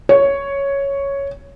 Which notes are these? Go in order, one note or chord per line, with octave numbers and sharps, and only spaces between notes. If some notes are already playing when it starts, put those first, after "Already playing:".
C#5